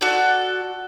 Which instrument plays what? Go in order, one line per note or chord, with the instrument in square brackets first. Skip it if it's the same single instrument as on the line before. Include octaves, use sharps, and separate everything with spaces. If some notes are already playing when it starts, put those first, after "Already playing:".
[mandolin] F#4 A4 D5